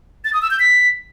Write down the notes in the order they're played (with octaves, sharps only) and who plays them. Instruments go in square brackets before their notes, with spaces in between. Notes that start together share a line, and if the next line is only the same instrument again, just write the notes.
[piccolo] A6
D#6
E6
G6
B6